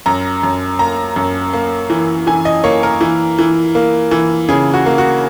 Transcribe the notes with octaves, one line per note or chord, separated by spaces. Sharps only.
F#2 A#5
F#2
A#3 A#5
F#2
A#3
E3
E3 G#5
D#5
A#3 C#5
A#4
E3
E3
A#3
E3
C#3 G#4
F#4
A#3
F#4